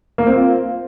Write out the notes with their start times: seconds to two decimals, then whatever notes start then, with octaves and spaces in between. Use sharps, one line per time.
0.18 A#3
0.27 C4
0.35 F4